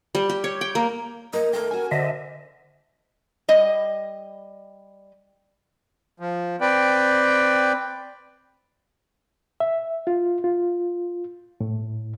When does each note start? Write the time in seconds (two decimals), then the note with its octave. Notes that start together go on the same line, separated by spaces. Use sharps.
0.15 G3
0.29 G4
0.44 C#5
0.61 G5
0.75 A#3
1.33 A#3 D#5 A#5
1.53 D#2 A3 A#4 G5
1.71 C#4 F#4 G#5
1.91 D3 C5 D#5 E5
3.48 G3 D#5
6.20 F3
6.61 C4 B4 D5 G5
9.60 E5
10.07 F4
10.44 F4
11.60 A2